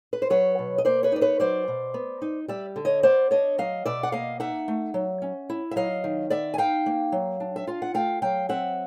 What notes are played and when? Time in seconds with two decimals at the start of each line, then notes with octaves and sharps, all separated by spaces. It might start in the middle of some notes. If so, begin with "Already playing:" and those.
0.13 B4
0.22 C5
0.30 F#3 B4 C#5
0.59 B2
0.78 D#5
0.85 A#3 C5 D5
1.03 B4 C#5
1.12 D#4 D5
1.21 B4 C#5
1.40 F#3 C5 D5
1.68 B2
1.94 B3
2.22 D#4
2.48 G3 D5 E5
2.76 D3
2.85 C#5 D#5
3.03 B3 C5 D5
3.31 D4 C#5 D#5
3.58 F#3 D#5 F5
3.86 B2 D5 E5
4.03 F#5
4.12 A#3 D#5 F5
4.40 D#4 E5 F#5
4.68 A3
4.94 F#3
5.22 C#4
5.50 E4
5.71 E5
5.76 F#3 D#5 F5
6.04 D#3
6.30 B3 D5 E5
6.54 G#5
6.58 D#4 F5 G5
6.86 A#3
7.12 F#3
7.40 D4
7.56 E5
7.67 F4 F5
7.82 F#5
7.94 A3 F5 G5
8.22 F#3 F5 G5
8.49 C4 E5 F#5